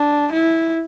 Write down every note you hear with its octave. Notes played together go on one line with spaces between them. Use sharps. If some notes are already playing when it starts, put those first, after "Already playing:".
Already playing: D4
E4